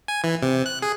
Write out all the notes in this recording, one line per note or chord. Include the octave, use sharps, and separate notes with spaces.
G#5
E3
C3
F#6
G#4